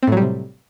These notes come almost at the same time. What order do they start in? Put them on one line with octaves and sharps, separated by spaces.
C4 A2 F#3 G3 C3